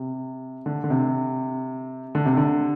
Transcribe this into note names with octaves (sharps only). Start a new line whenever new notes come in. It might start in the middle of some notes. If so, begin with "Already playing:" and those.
Already playing: C3
D3
D3
C3
D3
C3
D3